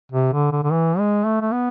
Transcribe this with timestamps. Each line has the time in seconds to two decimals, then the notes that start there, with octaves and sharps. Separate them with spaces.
0.12 C3
0.33 D3
0.52 D3
0.64 D3
0.72 E3
0.98 G#3
1.25 A3
1.42 A3
1.52 B3